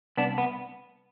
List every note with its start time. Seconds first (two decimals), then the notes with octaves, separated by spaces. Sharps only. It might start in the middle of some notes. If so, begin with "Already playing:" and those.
0.17 C2 B3 D4
0.38 B3